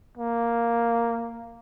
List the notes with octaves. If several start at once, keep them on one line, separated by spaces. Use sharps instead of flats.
A#3